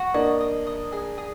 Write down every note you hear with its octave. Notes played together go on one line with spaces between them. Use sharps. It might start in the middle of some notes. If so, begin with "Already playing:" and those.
Already playing: F#4
A#3 D4 D#5
D#5
D#5
G#4
G#4